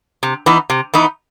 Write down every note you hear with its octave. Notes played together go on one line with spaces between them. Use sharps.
C3
E3 B3 D#4
C3
E3 B3 D#4